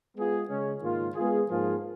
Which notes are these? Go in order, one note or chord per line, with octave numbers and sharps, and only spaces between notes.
G#3 B3 F4 G#4
C#3 G#3 C#4
G#2 D#3 A#3 F4
G#3 B3 F4 G#4
G#2 F3 A#3 F4 G#4